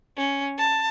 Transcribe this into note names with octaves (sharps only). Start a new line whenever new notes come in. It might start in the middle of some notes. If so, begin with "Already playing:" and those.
C#4
A5